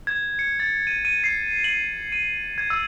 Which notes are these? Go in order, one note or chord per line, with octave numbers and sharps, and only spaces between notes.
G#6
C#7
A6
D#7
D#7
C7
F#7
D#7
G#6
E6